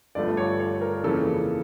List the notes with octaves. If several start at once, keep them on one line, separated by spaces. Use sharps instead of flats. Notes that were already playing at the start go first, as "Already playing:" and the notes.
G1 G2 F3 A3 D5
C#5
C#5
A#4
F2 C#3 E3 A#3 A4